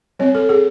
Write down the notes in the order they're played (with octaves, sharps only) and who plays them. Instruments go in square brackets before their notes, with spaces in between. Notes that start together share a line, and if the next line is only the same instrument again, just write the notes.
[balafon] G3 C4 C#5
A4
G#4